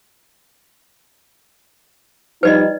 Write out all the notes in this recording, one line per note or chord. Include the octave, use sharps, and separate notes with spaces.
F3 G3 D#4 B4 D5 D#5